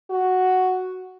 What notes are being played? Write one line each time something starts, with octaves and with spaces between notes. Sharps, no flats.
F#4